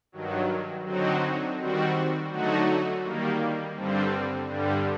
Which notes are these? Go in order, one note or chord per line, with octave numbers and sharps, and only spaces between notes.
G2 D#3 F#3
D3 F#3 C4 D#4 F#4
D#3 G3 C4 F#4
D3 F#3 A3 D#4 F#4
D#3 G3 A#3
G2 D3 G3 C4
G2 D3 G3